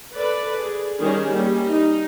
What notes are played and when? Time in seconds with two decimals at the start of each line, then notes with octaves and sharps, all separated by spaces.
0.15 A4 B4 D5
0.60 G#4
1.00 D#3 G3 C#4 G#4 A#4
1.32 G3 A#3 C#4
1.69 D#4